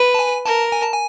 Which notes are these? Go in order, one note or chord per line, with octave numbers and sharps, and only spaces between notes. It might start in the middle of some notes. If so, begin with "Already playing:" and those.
Already playing: B4
A5
G#5
A#4 A5
G#5
A5
G#5